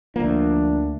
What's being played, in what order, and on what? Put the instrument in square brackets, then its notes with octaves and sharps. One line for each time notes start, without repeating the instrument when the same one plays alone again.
[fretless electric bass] D2 A#3 [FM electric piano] F3 [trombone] D4